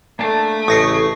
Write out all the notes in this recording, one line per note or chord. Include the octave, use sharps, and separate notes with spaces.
A3 A#3 D4 A5
A1 C#3 C#6 D#6 A#6 C7